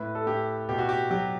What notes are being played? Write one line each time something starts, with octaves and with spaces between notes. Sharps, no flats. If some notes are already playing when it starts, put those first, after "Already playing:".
Already playing: A2 B4
A4
A2 G4
B2 G4
F#4
G4
F#3 G4